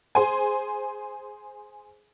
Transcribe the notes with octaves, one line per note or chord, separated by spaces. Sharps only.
G#4 C5 G#5